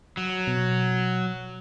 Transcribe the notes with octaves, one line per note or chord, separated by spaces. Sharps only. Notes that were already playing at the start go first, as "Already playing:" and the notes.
F#3
B2